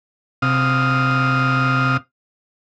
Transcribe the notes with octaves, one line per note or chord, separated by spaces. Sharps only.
C3 F5 D#6